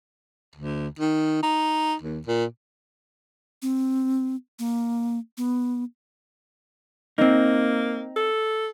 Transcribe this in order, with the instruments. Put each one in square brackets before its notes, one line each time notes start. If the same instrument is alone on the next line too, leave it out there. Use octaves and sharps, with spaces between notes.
[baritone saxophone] D2
D#3
D#4
D#2
A#2
[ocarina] C4
A#3
B3
[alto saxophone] A#3 [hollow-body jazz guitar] C4 D#4
[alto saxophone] A4